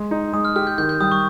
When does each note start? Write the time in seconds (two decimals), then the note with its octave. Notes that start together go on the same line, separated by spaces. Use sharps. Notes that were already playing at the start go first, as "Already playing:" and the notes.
Already playing: G#3 C6
0.11 D#4
0.33 G#3 D#6
0.45 F6
0.56 G4 F6
0.67 G6
0.78 D#3 G6
0.89 G6
1.00 G3 D#6
1.12 C#6